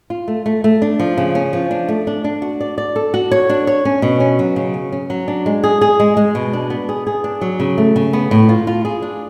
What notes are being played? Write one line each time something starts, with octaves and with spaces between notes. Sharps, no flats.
F4
A3
A3
A3
D4
F3
C#3
C#4
F3
D4
A3
D4
D4
F#4
D5
D5
A4
F#4
C#5
D4
C#5
C#4
B2
C#4
F#3
C#3
C#4
C#4
F#3
D4
G#3
G#4
G#4
G#3
G#3
B2
D4
B3
G#4
G#4
D4
F#3
C#3
A3
C#3
B3
A2
F4
F4
G#4
D4